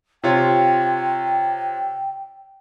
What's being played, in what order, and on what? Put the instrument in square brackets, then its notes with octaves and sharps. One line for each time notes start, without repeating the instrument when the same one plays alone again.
[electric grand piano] C3 F4 C#5 [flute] G5